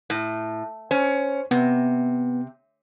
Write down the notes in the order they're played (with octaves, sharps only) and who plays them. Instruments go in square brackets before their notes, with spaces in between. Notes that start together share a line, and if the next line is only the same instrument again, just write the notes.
[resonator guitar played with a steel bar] A2
[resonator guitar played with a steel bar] C#4 [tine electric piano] C5
[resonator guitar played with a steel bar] C3 [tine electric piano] B3